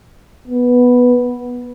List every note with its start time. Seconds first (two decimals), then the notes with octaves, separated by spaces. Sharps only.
0.47 B3